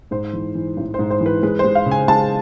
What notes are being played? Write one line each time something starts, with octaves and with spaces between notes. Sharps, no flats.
G#2 C5
E3
E3
A1
G#2 C5
C5
E3
B4
G#3 B4
C5
G#3
F5
C#3
G#5
G#3 A5